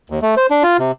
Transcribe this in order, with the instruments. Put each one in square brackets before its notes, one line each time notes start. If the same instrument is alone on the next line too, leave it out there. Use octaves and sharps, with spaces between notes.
[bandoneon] D#2
A3
C5
D4
F4
C3